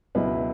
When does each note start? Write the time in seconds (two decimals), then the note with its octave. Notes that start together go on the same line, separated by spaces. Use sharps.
0.15 C#2 B2 F#3 E4 B4